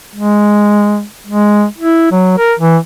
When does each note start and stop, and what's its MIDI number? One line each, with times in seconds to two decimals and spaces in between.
0.15 1.04 56
1.27 1.65 56
1.78 2.10 64
2.12 2.36 54
2.38 2.53 70
2.59 2.77 52